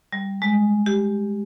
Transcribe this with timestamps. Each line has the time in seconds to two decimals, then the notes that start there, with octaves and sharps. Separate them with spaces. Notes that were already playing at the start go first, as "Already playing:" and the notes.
0.12 G3
0.42 G#3
0.86 G4